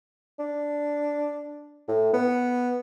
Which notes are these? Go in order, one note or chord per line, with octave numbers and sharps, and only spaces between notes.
D4
A2
B3